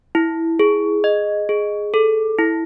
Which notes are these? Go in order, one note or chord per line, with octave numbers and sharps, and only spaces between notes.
E4
G#4
D#5
G#4
A4
E4